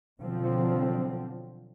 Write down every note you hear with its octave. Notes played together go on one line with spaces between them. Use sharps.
B2 D3 F3 F#3 C4